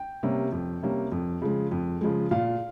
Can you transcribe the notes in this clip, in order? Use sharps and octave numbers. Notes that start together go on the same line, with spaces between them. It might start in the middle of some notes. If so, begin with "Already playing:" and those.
Already playing: G5
C3 G3 A#3 C#4
F2
C3 G3 A#3 C#4
F2
C#3 F3 G#3
F2
C#3 F3 G#3
A#2 F5